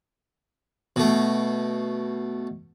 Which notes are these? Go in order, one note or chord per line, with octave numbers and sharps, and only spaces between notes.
B2 A3